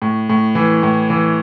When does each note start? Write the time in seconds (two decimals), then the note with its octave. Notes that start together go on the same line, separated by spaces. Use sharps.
0.02 A2
0.29 A2
0.55 E3
0.83 A2
1.10 E3